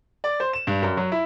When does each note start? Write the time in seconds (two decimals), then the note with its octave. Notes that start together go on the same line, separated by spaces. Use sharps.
0.24 D5
0.40 C5
0.53 E7
0.67 G2
0.82 F#2
0.97 F#3
1.12 E4